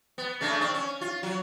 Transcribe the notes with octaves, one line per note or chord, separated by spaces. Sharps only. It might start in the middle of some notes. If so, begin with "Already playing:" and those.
B3
C#3 A3 D4
C4 D4
C#4
F4
F#3